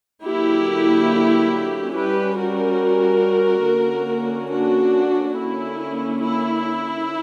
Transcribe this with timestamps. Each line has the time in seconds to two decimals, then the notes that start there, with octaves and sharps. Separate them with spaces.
0.25 D3 F#3 A#3 E4 G4
1.94 G3 C#4 G4 B4
2.38 F#4 A#4
3.65 D3 A#3 C#4
4.50 D4 F#4
5.35 D3 A#3 C#4 E4
6.21 E4